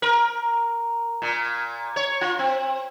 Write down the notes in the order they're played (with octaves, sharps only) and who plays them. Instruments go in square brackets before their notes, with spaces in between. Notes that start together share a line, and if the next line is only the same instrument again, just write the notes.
[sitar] A#4
A#2
C#5
F4
C4